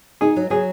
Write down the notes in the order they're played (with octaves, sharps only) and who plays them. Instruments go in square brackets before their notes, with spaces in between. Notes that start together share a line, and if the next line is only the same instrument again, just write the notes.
[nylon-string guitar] D#4 [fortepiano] G#4
[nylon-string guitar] F#3
[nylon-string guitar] F#3 [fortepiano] G#4